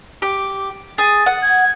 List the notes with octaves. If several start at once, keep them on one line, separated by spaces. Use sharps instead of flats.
G4 D6
G#4 A6
F#5
G#6